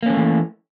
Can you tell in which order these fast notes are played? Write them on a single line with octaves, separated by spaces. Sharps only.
A#3 C#4 F3 A3 E3